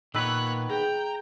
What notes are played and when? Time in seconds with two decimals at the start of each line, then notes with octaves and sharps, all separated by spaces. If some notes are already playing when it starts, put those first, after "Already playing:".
0.15 A#2 D#3 B3 B4 C#5 E6 F#6
0.70 G#4 G5 A#5